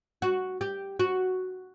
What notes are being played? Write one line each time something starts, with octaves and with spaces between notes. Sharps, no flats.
F#4
G4
F#4